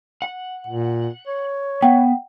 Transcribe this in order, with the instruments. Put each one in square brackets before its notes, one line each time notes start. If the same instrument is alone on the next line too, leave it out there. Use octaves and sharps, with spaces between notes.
[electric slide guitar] F#5
[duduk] A#2
C#5
[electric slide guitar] B3 [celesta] F#5 G5